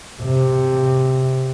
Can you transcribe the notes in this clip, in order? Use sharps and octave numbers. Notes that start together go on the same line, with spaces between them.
C3